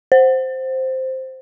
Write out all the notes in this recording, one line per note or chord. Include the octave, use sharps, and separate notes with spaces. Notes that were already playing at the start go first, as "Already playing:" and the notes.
C5